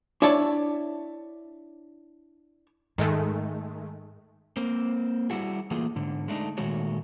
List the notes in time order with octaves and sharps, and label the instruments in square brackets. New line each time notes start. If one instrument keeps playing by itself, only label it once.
[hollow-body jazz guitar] D4 E4 C#5 A5
[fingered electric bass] G#2 [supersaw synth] D#3 G#3 A3
[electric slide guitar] A#3 C4
G3 E4 F#4 G#4
E3 A3 A#3 F4 G#4
G#2 D3
G#3 A3 D4 D#4
A#2 D#3 G#3 A3 F#4 C#5